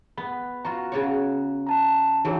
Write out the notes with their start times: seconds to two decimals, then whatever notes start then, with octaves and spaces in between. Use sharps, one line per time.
0.18 B3 B5
0.65 F4 F#4 A#5
0.92 C#3 F#4 C#5
1.67 A5 A#5
2.25 E3 F#3 D#4 G#4 C#5